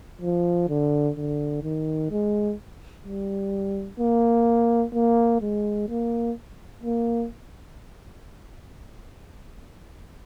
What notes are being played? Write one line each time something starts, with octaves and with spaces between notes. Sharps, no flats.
F3
D3
D3
D#3
G#3
G3
A#3
A#3
G#3
A#3
A#3